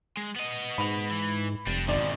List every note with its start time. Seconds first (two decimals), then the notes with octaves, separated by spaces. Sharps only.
0.17 G#3
0.36 B3 D#5
0.78 G#2 B5 F7
1.11 E3
1.67 F1 G3 D4
1.88 G#1 B2 D3 D5